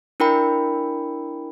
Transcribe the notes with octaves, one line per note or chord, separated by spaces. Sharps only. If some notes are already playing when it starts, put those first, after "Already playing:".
D4 E4 A#4 G5 B5